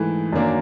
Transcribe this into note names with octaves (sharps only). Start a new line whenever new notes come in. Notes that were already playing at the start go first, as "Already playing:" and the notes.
Already playing: G#2 E3 A3
F#2 D#3 F#3 A#3 D4